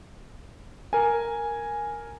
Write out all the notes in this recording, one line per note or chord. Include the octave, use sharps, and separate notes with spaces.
A#4 G#5